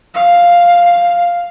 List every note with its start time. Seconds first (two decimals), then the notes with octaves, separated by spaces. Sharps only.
0.14 F5